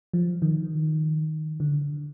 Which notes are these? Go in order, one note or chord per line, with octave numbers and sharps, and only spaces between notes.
F3
D#3
D3